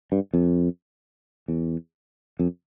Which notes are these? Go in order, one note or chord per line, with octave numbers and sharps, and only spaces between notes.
G2
F2
E2
F2